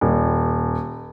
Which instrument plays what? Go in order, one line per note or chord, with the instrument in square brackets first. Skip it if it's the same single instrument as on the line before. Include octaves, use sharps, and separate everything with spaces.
[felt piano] D#1